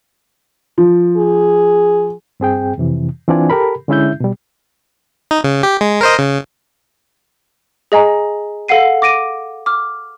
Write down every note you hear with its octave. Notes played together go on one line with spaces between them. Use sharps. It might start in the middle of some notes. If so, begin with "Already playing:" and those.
F3
G#4
G2 C4 G#4 G5
F2 C3 E3
E3 C4 D4 F4 D5 G#5
G4 A4 A#4 B5
D3 G#3 C#4 E4 E5 G6
B2 G3
D#4
C#3
G4
G#3
A#4 C5 D#5
C#3
G#4 D#5 G#5 A#5
A4 F5 F#5 C7 D#7
D6 A#6 D7 D#7
D6 F6